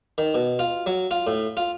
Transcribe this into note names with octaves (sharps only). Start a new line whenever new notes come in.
D#3
B2
F4
F#3
F4
A2
F4